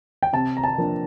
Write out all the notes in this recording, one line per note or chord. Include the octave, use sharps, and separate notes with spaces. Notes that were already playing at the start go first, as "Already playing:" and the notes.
G5
C3 A5
A#5
A5
F3 A#3 D4